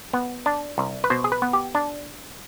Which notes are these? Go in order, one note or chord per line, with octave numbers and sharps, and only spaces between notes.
B3
D4
C2
B4
B2 C5
G#4
B4
B3
G4
D4